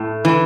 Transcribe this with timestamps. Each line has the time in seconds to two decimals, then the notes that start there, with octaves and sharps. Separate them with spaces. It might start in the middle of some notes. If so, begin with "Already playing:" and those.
Already playing: A2
0.25 E3